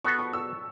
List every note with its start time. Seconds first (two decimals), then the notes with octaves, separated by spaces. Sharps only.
0.04 B3 F#4 A4 C#6
0.19 C#6
0.33 E6